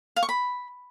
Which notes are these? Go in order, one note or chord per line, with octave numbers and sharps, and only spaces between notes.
F5
C#6
B5